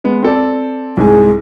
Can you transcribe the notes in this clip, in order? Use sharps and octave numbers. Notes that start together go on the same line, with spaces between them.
G#3 B3
C4 A4 D5
C2 G#2 G#3 G#5